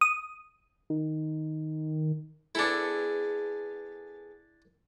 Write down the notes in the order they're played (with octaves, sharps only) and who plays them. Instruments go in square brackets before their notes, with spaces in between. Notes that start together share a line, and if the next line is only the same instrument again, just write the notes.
[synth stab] D#6
[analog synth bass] D#3
[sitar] B3 G#4 A4 [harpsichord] D4 E4